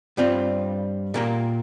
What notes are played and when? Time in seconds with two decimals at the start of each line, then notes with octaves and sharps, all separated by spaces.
0.17 G2 G3 C4 F4
1.14 A#2 A#3 G4 A#4